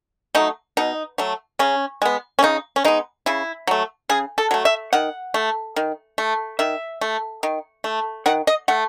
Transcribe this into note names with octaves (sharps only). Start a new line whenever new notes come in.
F#3 A3 D#4
B2 D#4
F#3 A3
C#3 C#4
G#3 B3
C#4
C#3 D#4
C#4
G#3 B3 D#4
C#3 E4
F#3 A3
C#3 G#4
A4
F#3 A3
E5
D#3 F#5
A3
D#3
A3
D#3 E5
A3
D#3
A3
D#3 F#5
D#5
A3 F#5